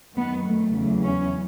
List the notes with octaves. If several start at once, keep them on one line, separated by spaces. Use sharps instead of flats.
F#2 D#3 F#3 B3
A3
E2 C#3 F#3
C#4